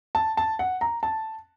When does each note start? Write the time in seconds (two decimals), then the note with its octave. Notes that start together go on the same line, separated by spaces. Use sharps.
0.15 A5
0.37 A5
0.59 F#5
0.81 A#5
1.03 A5